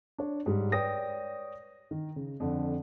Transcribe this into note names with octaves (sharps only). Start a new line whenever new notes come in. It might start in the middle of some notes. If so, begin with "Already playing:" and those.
D4 C#5
G#2 G3
B4 C#5 D5 G5 D#6 A#6
D#3
C#3
F2 D3